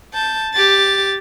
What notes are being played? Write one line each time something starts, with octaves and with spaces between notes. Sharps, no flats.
A5 G6
G4 A6